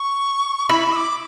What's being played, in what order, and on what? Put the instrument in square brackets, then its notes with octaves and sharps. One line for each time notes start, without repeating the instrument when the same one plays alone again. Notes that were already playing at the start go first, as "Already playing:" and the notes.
Already playing: [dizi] C#6
[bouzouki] E4 [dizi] B5
[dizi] E6
D6